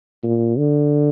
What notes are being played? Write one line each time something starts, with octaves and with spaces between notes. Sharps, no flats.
A#2
D3